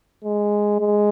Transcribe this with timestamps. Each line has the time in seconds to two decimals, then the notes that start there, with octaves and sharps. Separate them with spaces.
0.24 G#3
0.80 G#3